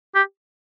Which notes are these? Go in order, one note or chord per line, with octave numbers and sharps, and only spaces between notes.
G4